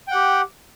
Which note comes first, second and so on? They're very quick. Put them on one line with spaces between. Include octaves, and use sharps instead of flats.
G5 F#5 G4